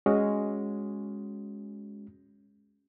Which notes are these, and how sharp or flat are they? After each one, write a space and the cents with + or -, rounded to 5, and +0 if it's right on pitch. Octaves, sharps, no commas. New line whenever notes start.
G#3 +0 C#4 +0 F#4 +0